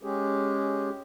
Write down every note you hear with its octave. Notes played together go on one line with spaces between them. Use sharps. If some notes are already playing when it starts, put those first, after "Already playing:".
G#3 C#4 G4 G#4